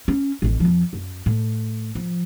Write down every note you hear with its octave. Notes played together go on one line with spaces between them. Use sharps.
C#4
A1 F2
F2 F3
F#2
A2
F3